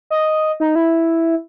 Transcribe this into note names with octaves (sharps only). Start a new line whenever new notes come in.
D#5
D#4
E4